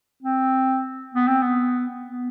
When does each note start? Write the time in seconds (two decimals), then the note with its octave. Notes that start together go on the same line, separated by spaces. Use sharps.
0.23 C4
1.15 B3
1.28 C4
1.42 B3
2.05 B3